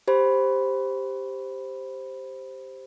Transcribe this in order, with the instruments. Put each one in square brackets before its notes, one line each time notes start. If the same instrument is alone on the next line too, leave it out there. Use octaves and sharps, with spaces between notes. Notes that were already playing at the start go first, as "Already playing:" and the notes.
[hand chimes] G4 C5 B5